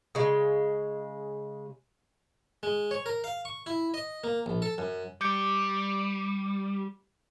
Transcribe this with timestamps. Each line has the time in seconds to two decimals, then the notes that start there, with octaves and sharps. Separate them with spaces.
0.15 C#3 G#3
2.63 G#3
2.91 C#5
3.06 A#4
3.24 F5
3.45 C#6
3.66 E4
3.94 D#5
4.24 A#3
4.46 A#1
4.62 A4
4.78 F#2
5.21 G3 D6 G6 C#7